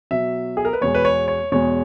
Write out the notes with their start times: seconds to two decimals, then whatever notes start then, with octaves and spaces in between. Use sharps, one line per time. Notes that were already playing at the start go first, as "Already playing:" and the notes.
0.11 B2 F#3 E5
0.57 G#4
0.65 A#4
0.73 B4
0.81 E2 B2 G#3 C#5
0.95 B4
1.05 C#5
1.28 C#5
1.52 E2 B2 G#3 C#5